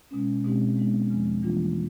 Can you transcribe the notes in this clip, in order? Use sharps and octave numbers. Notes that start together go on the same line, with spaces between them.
B2 G#3 C#4
B2 G#3 C4 D#4 G4
G#3 B3 D#4
E2 C#3 F3 G#3
E3 G3 A#3 D4 F4